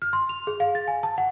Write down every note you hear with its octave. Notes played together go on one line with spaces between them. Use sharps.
F6
C6
F7
G#4
F5
A6
G#5
A5
F#5